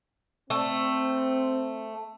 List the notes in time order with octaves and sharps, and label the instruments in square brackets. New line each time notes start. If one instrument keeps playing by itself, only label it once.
[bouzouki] A3 [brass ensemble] C4